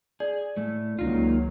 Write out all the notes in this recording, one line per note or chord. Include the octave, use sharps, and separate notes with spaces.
G#4 D5
A2 A3
C#2 D#3 F#3 A#3 D#4 F4